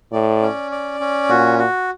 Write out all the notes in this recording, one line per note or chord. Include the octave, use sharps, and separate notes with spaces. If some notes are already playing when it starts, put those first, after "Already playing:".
A2 D5
C#4
D5
C#4
A#2 F#4
F#4